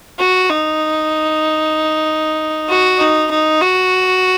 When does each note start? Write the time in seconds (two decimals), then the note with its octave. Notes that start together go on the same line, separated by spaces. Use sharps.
0.19 F#4
0.49 D#4
2.68 F#4
2.99 D#4
3.30 D#4
3.61 F#4